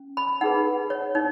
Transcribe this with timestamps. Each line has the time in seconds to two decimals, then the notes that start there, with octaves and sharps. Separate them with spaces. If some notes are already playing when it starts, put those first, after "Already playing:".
Already playing: C#4
0.17 B5
0.41 D#4 F#5
0.44 G#4 B4
0.90 C#5
1.15 D#4 C#5